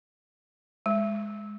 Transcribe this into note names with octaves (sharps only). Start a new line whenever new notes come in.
G#3